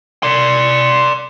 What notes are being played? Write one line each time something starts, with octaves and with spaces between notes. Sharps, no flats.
D5 C6